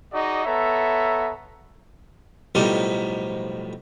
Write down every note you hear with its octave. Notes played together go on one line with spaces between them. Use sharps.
D#4 F#4 G#4 D5 D#5
B3 A4 C#5 E5 A#5
B1 A2 F3 G3 D#4 C5